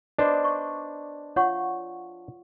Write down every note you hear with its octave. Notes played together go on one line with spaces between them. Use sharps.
D4 B4 C5 D5 D#5
C#6
F4 C#5 F#5 C#6